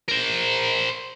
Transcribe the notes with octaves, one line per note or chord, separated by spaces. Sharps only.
A#4 C5